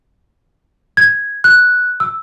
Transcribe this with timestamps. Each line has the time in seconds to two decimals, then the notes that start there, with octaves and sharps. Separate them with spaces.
0.97 G#6
1.44 F#6
2.00 E6